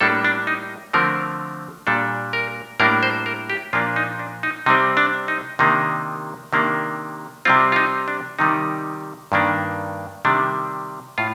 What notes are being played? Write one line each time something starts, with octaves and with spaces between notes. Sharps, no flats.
A2 G3 A#3 D4 A4
D4
D#4
D3 F3 A3 C4 A#4
A#2 G3 D4 A4
A#4
A2 G3 A#3 D4 A#4
C5
A#4
G4
A#2 F3 A#3 D4 F4
D#4
D4
D#4
C3 G3 C4 D#4
D4
D#4
C3 D#3 A#3 D4 D#4
C3 D#3 A#3 D4
C3 G3 C4 F4
F4
D#4
D4
C3 D#3 G3 D#4
G2 D#3 A#3 D4
C3 D#3 G3 D4
A2 F4